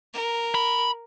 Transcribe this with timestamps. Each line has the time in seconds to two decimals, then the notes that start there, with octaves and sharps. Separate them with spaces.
0.13 A#4
0.55 B5